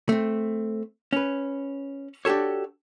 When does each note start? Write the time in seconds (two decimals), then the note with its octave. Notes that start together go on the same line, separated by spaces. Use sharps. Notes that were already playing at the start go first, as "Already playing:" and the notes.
0.09 A3 C4
1.13 C#4 B4
2.25 D4 F#4 G4 A4 C#5